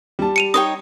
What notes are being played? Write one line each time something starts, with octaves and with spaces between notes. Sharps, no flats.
G3 G4 A5
C#7 D#7 F7
D#4 C#5 G5 D#6